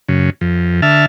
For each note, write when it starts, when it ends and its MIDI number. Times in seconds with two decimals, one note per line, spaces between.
0.09 0.30 42
0.09 0.30 49
0.41 0.81 41
0.82 1.06 50
0.82 1.06 76
0.82 1.06 81
0.82 1.06 89